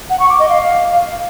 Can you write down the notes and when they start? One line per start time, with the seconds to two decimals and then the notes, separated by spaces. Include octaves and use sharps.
0.10 F#5
0.20 C#6
0.30 D6
0.39 D#5
0.49 F5